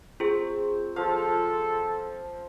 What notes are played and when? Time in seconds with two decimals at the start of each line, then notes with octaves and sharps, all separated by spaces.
0.20 C4 F4 G#4
0.96 F3 A4 F5